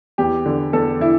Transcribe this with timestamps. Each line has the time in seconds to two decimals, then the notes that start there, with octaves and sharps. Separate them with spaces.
0.18 E2 G4
0.46 D3
0.73 E2 A4
1.00 D3 E4